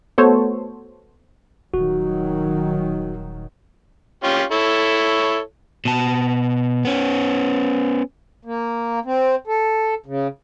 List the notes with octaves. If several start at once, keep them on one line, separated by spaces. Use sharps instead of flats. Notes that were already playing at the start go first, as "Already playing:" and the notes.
A3 B3 F#4 A4 C5 C#5
D#1 D#3 F#3 F#4
C#4 F4 G4
E4 A4 C#5
B2 A5
B3 C#4
A#3
C4
A4
C#3